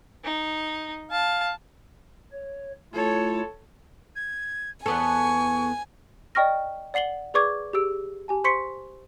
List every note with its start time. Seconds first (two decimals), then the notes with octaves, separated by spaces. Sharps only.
0.24 D#4
1.12 F5 A5
2.32 C#5
2.94 A3 E4 F4 A4 C#5
4.16 G#6
4.86 E2 B3 A4 G#5 C#6
6.35 D5 D#5 G5 C#6 F6 A#6
6.94 D5 F#5 C7 F#7 G7
7.34 G#4 B4 D5 C#6 D6 G#6
7.73 G4 G#4 E6 D7
8.28 G4 G#5 A5
8.44 C5 C6 C#6 B6 C#7